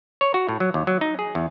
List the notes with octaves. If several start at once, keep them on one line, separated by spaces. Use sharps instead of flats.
C#5
F#4
A2
F#3
D#2
F#3
D#4
G#4
E2